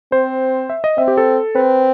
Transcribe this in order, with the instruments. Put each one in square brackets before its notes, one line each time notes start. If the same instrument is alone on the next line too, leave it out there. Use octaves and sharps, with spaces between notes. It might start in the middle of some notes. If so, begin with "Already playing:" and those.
[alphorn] C4 [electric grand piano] C5
[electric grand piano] E5
D#5
[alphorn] C4 [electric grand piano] E5
[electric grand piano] G4
A4
[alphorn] C4 [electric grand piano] B4